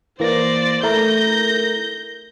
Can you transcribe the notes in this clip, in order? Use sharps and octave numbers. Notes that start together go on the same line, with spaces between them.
E3 A#3 C5 D5 A#6
A3 E4 A#4 G6 A#6